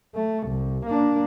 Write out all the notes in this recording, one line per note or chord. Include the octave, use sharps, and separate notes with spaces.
A3
C2
A#3 D4